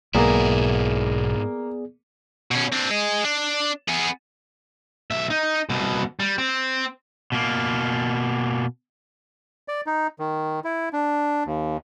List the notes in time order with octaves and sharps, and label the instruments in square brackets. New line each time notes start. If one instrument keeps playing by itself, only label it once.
[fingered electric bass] B1 [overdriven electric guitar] G#2 E4 [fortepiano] A#3 A#4 [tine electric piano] B3 G#4 D5
[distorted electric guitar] B2 C#4
C4 D4
G#4 D#5
D4
B3 G#4
[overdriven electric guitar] B1 E5
D#4
C2 B2
G3
C4
B2 A#3
[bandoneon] D5
D#4
D#3
E4
D4
D#2